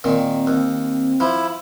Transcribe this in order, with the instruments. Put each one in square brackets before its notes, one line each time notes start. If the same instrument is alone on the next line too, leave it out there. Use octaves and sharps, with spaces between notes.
[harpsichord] A#2 D#3 [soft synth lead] C4
[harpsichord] D#2
[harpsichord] F3 [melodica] E4